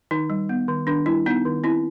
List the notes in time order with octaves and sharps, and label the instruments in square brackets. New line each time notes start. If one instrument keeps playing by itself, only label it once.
[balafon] D#3 D#4
G3
B3
D#3
D#3 D4
G3 E4
B3 D#4
D#3
C4 E4